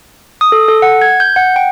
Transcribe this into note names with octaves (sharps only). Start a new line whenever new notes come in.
D#6
A4
A4
F#5
G#6
G6
F#5
G5